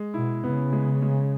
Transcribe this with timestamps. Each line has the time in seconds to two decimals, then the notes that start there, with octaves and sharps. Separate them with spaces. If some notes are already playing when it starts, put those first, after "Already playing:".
Already playing: G#3
0.14 B2 E4
0.44 C#3 B3
0.73 G#3
1.02 G#3